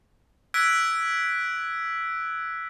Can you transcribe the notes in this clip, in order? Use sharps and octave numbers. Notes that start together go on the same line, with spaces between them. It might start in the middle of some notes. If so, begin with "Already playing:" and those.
E6 F#6 G#6 B6 D7